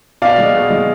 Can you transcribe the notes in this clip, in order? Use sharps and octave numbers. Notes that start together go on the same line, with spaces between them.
B2 D5 F5
G#3
B2
G#3